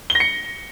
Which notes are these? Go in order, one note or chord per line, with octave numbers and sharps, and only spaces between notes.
G7
A#6
C#7